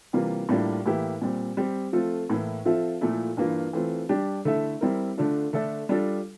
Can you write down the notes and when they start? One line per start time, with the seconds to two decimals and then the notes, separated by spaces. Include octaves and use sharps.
0.13 C3 E3 G3 A#3 F4
0.49 A2 G3 A#3 D4 F4
0.86 A2 E3 A#3 E4 G4
1.21 A#2 G3 C4
1.57 G3 C4 G4
1.93 F3 A3 C4 F4 A4
2.30 A2 E3 A#3 E4
2.65 F3 C4 F4 A4 E5
3.01 A#2 F3 A3 E4 A4
3.37 G2 E3 A#3 F4
3.73 E3 A3 C4 F4
4.09 G3 D4 G4
4.45 D3 A3 E4 A4 E5
4.81 G3 C4 E4 A#4
5.17 D3 A3 D4 F4
5.53 D3 A3 D4 A4 E5
5.89 G3 D4 F4 A4